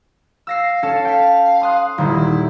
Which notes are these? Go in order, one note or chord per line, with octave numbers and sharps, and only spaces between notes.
F5 E6 A#6 C7
C#4 A4 A5
F5 G5 B6
C6 D#6 F#6
D#1 A#2 D#3 E4